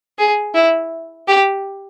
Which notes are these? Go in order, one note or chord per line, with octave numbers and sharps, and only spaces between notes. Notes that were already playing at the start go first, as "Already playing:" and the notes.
G#4
E4
G4